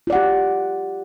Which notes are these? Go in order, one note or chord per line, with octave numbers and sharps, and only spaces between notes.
F4 G4 D5 F#5